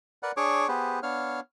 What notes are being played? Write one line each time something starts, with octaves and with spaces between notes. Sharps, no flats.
A#4 B4 D5 F#5
D4 G#4 C#5 C#6 D6
B3 G4 G#4 B4 C5
B3 D4 C#5 F5 F6